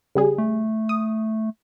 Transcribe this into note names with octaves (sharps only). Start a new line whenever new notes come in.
C#3 G3 G#4
A3
D#6